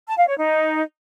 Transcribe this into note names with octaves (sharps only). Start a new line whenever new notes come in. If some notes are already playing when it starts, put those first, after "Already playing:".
A5
F5
C#5
D#4